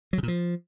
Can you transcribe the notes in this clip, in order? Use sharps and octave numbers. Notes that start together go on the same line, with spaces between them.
F#3
C#3
A#2
F3